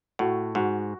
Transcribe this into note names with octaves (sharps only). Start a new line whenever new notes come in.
A2 F#4
G#2 F#4